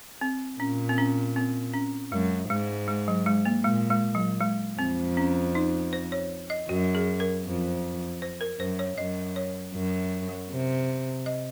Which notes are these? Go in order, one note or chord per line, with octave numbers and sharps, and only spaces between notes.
C4
A#2 C#4
C4
C#4
C4
C#4
F#2 G#3
G#2 G#3
G#3
F#3
G#3
A#3
A#2 G#3
G#3
F#3
G#3
F2 C4
C#4
D#4
C5
C#5
D#5
F#2 F#4
G#4
A#4
F2
C5
A#4
F#2 C5
C#5
F#2 D#5
C#5
F#2
C3
D#5